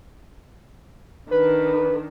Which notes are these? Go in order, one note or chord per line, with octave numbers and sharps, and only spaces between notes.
D#3 D4 B4